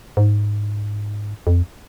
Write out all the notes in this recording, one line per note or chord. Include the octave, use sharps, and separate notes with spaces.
G#2
F2